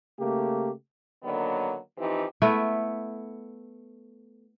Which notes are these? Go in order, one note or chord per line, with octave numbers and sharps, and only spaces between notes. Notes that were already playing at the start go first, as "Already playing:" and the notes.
C#3 A3 A#3 G4
D3 D#3 F#3 A#3 B3
E3 F3 C4 D#4 G4
A3 B3 E4